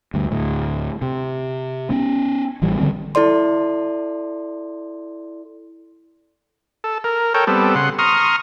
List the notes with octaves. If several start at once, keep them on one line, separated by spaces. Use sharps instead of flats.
D2 G2
D2 A2
C3
B3 C#4
A1 E3 G3
D3 F#3 G3 C4
E4 A4 D5 C6
A4
A#4
A4 A#4 C#5 G5
G3 B3 C4 A4
C#3 F#5 C6
A#5 C6 C#6 D#6 F6